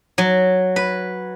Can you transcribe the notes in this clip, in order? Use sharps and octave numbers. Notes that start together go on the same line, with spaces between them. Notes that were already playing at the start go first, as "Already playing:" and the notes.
F#3
B4